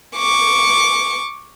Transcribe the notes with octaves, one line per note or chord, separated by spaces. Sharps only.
C#6 D6